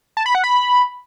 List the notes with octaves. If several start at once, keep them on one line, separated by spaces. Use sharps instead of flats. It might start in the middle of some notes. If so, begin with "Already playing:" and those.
A5
B5
F#5
B5